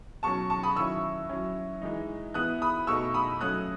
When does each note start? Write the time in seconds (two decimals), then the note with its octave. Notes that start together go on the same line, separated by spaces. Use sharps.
0.23 B2 F#3 C#4 A5 C#6
0.50 A5 C#6
0.63 B5 D#6
0.76 D#3 F#3 C#4 E4 C#6 E6
1.29 F#3 C#4 E4
1.82 E3 G#3 D#4
2.34 E3 B3 E4 D#6 F#6
2.62 B5 D#6
2.87 B2 A3 D#4 C#6 E6
3.14 B5 D#6
3.41 F#3 A3 C#4 D#6 F#6